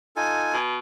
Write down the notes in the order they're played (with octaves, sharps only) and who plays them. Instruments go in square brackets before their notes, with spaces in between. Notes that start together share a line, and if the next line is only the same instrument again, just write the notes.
[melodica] D#4 F4 A4 [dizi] G#5
[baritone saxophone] B2